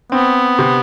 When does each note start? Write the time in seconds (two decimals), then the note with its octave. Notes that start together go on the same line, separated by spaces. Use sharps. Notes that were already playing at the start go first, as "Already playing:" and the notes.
0.12 B3 C4
0.59 C3